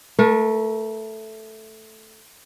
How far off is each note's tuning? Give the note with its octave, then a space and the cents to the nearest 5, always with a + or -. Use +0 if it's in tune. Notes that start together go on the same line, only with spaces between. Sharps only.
A3 +0 A#4 +40